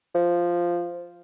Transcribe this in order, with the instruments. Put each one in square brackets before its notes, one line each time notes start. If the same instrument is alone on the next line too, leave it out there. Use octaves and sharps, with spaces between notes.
[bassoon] F3